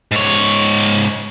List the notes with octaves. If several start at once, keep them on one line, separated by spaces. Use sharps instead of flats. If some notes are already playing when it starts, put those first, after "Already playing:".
G#2 C#5